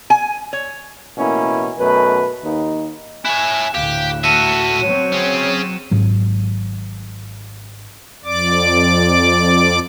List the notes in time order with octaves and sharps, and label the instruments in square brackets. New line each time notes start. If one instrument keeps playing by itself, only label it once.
[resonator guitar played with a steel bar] G#5
C#5
[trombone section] A1 B2 A#3 C#4 E4
F#2 B2 A3 B4
D#2 D#4
[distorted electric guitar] E4 C#5 [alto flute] G#5 [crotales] F#6 E7
[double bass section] D2 A2 [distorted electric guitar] G4 [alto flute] F5
[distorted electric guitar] F#4 E5 [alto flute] A5 [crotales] C#7 D#7 E7
[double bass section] F#3 C4 [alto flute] C#5
[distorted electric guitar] C#4 G#4
[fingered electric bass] G#1 G#2 F#3
[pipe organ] F2 D5 D6